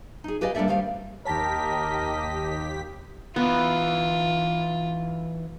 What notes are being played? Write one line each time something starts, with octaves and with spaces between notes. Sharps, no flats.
D#4 G#4
G4 B4 D5 D#5 F5 G#5
G3 A#3 D4 A4 D5 E5
D#3 G3 C5 F5
D#2 G4 A#4 C#5 D#5 A5 A#6 B6
E3 B3 D#4 F4